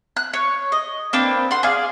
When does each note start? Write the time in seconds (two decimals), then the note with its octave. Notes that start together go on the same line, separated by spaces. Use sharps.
0.17 F#6
0.34 C#5
0.72 D#5
1.13 A#3 C4 D4 B4
1.51 F#5 C6
1.63 G#4 D5 F5